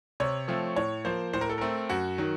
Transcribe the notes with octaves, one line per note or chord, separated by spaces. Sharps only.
C3 C#5
F3 A3 C4
A2 C#5
F3 A#3 C5
A2 C5
A#4
A4
A3 C4 A#4
F#2 F#4
D#3 F#3